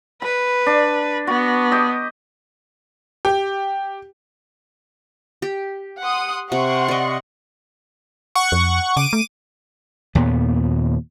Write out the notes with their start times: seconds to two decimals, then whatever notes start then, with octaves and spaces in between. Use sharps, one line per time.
0.22 B4 B5
0.66 D4
1.27 B3 F#4
1.72 G4 D#5
3.25 G4
5.42 G4
6.01 F#5 C6 D#6
6.52 C3 F#5 C6 C#6
6.88 D5 D#5
8.35 F#5 C#6
8.52 F2
8.97 C#3 D6 D#7
9.13 A3
10.15 D#2 A#2 B3